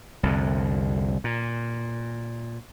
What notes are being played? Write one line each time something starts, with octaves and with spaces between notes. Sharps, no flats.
C2 F2 D3
A#2